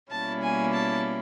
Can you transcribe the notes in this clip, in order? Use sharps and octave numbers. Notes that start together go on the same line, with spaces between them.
B2 G3 A#3 C#4 E4 A5
G#5
A5